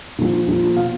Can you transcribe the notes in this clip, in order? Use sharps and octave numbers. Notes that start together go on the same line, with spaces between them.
A#2 F3
A#2 F3
B2 F5